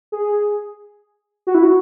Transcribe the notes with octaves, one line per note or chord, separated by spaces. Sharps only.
G#4
F#4
E4
F#4